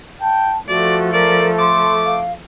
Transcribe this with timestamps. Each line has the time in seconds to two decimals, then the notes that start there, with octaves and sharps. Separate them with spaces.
0.21 G5 A5
0.69 F3 A3 F#4 A4 D5
1.13 A#4 D5
1.59 C6 D6
2.05 F5